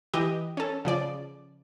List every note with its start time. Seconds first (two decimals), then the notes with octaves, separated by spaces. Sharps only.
0.14 E3 G4 D#5
0.57 C#4 A4
0.85 C#3 F3 D5